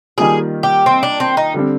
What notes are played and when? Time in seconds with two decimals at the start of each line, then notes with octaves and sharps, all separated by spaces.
0.18 D#3 G3 A#3 F4 G#4
0.63 G4
0.86 C4
1.03 D4
1.20 C4
1.37 D#4
1.54 D3 G3 C4